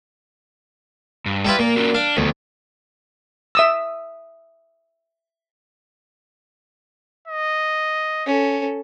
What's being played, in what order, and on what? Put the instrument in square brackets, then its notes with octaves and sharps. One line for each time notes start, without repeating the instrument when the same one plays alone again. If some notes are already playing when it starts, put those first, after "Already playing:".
[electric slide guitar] G2
[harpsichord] G3 E4 F4 [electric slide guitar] A4 B4
[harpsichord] A#2 [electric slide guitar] A#3
[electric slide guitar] C#4 F4 F#4
[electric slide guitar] D4 [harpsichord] F5
[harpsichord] D2 [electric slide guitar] D#3 F3 B3
[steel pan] E5 D#6 E6
[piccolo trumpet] D#5
[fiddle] C#4 A4